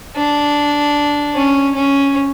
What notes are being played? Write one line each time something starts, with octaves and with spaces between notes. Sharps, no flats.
D4
C#4
C#4